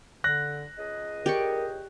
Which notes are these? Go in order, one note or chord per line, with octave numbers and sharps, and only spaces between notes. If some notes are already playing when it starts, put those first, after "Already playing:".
D3 F#6 A#6
C#2 G#4 D#5
G4 A#4 D5 C#6